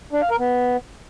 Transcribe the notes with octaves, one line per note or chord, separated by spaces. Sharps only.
D4
F5
A#4
B3